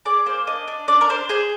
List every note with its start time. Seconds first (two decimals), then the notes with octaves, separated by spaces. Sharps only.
0.05 G#4 D5
0.26 A#3 C5
0.47 D4 D#5
0.68 D4
0.88 D4 D5
1.01 A#4
1.09 D4 C5
1.29 G#4 C5